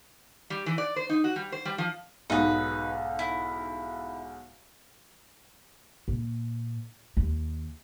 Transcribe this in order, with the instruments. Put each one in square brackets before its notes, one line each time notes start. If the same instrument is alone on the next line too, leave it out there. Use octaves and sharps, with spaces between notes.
[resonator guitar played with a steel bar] G3
E3
D5
C5
D#4
F#4
G3
C5
G3
F3
[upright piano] B1 G#2 [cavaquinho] D#4 B4
[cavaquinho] E4
[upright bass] A#2
D#2